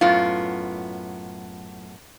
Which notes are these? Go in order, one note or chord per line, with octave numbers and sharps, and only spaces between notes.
F#2 A2 B3 F4